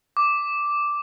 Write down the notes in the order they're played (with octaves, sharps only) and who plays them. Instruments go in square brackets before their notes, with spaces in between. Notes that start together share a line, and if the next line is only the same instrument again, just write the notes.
[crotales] D6